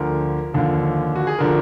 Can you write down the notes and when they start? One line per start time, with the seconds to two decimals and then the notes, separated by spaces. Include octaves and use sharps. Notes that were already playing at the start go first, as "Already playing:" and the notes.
Already playing: D2 D3 F3 A#4
0.54 D#2 D3 F3
1.16 F#4
1.27 G#4
1.39 D3 F3 A#4